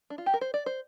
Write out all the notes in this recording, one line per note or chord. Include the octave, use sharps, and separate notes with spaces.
D4
F4
G4
A#4
C5
D5
C5